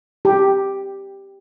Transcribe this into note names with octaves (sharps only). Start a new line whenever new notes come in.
G4